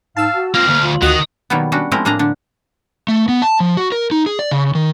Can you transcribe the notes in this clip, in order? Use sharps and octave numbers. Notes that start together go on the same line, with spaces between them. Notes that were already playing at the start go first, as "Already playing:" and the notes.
G#2 F5 A5 E6
F#4
A#3 C4 F4 F6
D2 A#3
F4
D2 D#3 F#4 D#5 F#6
B2 D#3 F#3 G3 A#3 B3
G3 C#4 D4 F#4
F3 G#3 A3 C4 E4 A#4
A2 A#3 D4 G#4 A#5
D3 D4
A3
B3
A5
F3
F#4
A#4
D#4
G#4
D5
C#3
D#3